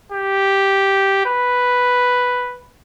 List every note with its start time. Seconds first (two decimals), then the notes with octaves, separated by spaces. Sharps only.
0.12 G4
1.26 B4